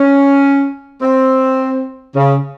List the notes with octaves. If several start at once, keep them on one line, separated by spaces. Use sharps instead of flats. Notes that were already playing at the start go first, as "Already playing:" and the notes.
Already playing: C#4
C4
C#3